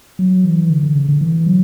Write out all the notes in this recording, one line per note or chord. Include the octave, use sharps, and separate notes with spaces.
F#3
E3
D3
D3
C#3
D3
E3
F#3